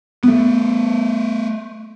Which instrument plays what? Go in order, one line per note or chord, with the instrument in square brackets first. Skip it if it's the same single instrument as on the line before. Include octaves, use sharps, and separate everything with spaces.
[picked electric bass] A3 B3